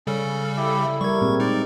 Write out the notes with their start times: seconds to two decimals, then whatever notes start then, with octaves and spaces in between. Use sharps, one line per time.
0.07 C#3 G3 C#4 A4
0.57 E4 G4
0.88 E4
1.01 G3 A#4 C#6 G#6
1.21 A#2 G#3 C4
1.40 D#4 A#4 D5